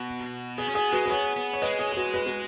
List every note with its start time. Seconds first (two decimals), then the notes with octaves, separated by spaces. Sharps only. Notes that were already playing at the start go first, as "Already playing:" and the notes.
Already playing: B2 F#4
0.58 B3 G#4
0.68 C#4
0.75 B3 G#4
0.92 G#3 F#4 B4
1.06 B4
1.10 B3 G#4 C#5
1.36 B3
1.53 C#5
1.62 G#3 B4 D#5
1.79 G#4 C#5
1.92 G#4
1.97 F#4 B4
2.14 F#4 B4
2.26 F#4 B4